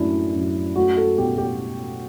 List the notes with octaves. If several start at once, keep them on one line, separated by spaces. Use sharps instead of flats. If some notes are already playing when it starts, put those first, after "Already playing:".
Already playing: F#2 A3 D4 E4
F#2
A3 F#4
A4
B2 G4
G4